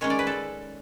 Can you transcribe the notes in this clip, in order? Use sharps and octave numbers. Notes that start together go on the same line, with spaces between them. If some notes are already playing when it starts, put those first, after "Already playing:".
D#3 G#3 C#4 C#5
D5
B4
A4